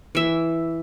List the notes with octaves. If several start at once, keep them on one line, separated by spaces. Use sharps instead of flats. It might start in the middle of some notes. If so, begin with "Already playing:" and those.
E3 E5